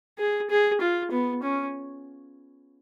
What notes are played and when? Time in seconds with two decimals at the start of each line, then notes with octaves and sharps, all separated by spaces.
0.19 G#4
0.50 G#4
0.81 F4
1.11 B3
1.42 C#4